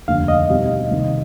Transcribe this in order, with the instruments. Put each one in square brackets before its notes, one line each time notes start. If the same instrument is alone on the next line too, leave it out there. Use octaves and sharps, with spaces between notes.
[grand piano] F1 D#2 D3 [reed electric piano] F5
[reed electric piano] D#5
[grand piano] B2 G3 C4 D#4 G4
C2 C3 D#3